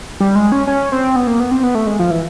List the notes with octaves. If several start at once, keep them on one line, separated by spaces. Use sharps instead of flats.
G3
G#3
C#4
C#4
C4
B3
A#3
B3
C4
B3
A3
G#3
F3
E3